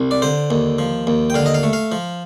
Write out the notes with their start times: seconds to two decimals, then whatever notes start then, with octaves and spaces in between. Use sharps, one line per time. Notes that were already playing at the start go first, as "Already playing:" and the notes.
Already playing: C2
0.11 D5
0.22 D3 C5
0.51 D#2
0.79 F3
1.07 D#2
1.30 G5
1.34 D3 F5
1.46 D#5
1.54 F5
1.63 A3
1.73 F5
1.92 F3